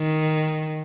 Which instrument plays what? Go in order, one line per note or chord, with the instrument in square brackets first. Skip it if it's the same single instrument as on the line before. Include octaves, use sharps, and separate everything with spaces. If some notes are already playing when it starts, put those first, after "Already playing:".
Already playing: [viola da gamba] D#3